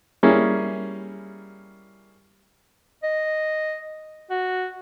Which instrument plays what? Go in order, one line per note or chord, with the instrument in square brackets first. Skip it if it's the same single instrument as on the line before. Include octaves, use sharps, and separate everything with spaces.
[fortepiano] G3 A#3 C#4 E4 G#4
[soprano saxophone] D#5
F#4